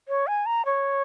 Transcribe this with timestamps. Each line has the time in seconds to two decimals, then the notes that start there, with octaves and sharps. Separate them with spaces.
0.08 C#5
0.27 G#5
0.46 A#5
0.65 C#5